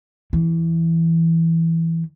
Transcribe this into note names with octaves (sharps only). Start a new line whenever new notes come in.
E2 E3